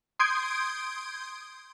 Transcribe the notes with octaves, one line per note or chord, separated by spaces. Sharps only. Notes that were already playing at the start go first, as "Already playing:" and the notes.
C6 D#6 G6 G#6 D7